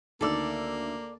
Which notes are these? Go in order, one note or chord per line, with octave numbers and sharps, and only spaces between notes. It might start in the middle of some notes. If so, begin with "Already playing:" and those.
D2 D#3 A#3 A4 D5 E6